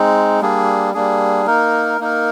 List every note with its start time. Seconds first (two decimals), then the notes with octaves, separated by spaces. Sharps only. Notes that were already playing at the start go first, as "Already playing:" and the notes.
Already playing: G#3 C4 D#4
0.41 G3 A#3 D4 G#4
0.94 G3 A#3 D4 G#4
1.46 A#3 D#4 A#4
2.00 A#3 D#4 A#4